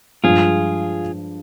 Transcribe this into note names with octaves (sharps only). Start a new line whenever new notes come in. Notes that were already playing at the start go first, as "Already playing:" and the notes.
G2 F3 G#3 F4 G#4